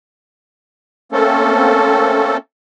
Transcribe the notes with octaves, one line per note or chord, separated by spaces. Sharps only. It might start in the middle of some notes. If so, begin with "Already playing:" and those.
A3 A#3 C4 C#4 A4